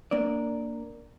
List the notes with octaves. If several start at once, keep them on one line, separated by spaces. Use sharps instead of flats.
A#3 D4 D5